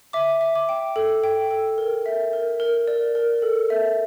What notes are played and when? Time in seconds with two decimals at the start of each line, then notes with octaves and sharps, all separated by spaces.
0.13 E5 D6
0.41 E5
0.55 D6
0.69 G5
0.96 A4
1.24 G5
1.51 A4
1.78 A#4
2.06 E5
2.33 A#4
2.60 A#4
2.88 D5
3.15 A#4
3.42 A4
3.70 E5